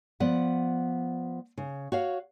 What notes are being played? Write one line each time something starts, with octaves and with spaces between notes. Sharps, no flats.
F3 B3 D5 F#5
C#3
F#4 C#5 F5